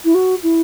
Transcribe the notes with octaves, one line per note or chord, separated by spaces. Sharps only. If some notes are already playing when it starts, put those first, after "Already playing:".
E4
F#4
E4